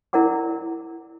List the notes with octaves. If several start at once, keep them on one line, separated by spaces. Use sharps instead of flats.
E4 A#4 D5 F#5 D6